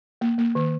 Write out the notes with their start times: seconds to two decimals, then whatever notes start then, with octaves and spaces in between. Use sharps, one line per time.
0.21 A#3
0.38 A#3
0.55 D#3